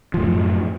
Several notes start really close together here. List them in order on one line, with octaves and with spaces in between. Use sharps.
F3 A2 F#2